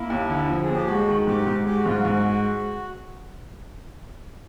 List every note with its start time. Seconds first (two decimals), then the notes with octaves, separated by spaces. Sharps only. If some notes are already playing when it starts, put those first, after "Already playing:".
Already playing: A#3 E4
0.10 D#2
0.30 D3
0.49 F3
0.63 D#2 G#4
0.75 G4
0.88 G#3 F#4
1.08 D#3
1.27 G#2 G4
1.47 G#2
1.66 G#3 G4
1.76 F#4
1.86 G#2 F4
1.97 F#4
2.05 G#2
2.25 G#3